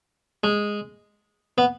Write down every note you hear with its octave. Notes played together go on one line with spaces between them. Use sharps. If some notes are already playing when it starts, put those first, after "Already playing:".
G#3
B3